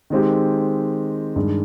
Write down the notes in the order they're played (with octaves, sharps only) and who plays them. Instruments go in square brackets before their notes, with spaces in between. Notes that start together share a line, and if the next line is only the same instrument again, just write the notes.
[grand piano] D#3 G#3 C4 G4
G2 D#3 G#3